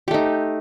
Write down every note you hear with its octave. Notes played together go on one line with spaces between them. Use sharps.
A3 D#4 G4